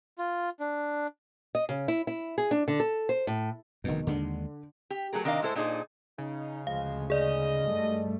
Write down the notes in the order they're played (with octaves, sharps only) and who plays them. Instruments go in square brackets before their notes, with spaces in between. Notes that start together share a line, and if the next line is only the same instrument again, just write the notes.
[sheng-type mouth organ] F4
D4
[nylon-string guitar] D#5
C#3
E4
E4
G#4
D4
D3
A4
C5
A2
[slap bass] F1 E2 [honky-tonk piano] B2 D#3
[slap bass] D#2 D#3 G#3 [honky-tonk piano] D3
[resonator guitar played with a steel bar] G4
F#3 A3 G#4 A#4
C3 D#3 D4 A#4 D#5 F5
A2 G#3 E4 A4 C5
A#2 D4 D#4 G#4 C5
[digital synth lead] C#3 [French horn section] D#4
[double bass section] D2 [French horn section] F3 G#3 [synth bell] F5
[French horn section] G#3 D#4 D#5 [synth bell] G#4 D5
[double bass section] G2 G3 A3